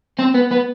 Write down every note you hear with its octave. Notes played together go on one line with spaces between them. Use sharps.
C4
B3
B3